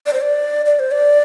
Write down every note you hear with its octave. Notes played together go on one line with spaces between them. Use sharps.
D5
C5
D5
D5
C5
D5